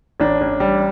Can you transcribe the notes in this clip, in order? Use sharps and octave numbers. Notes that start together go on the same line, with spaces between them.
A1 D4
A1
G3